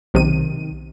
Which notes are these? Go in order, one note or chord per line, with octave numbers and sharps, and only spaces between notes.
B1 C3 D#3 D#7